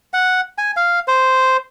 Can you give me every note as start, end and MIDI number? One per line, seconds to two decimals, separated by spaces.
0.13 0.41 78
0.58 0.71 80
0.77 0.99 77
1.08 1.57 72